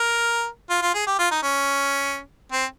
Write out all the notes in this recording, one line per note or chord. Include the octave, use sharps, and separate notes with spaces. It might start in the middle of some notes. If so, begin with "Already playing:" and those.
Already playing: A#4
F4
F4
G#4
G4
F4
D#4
C#4
C4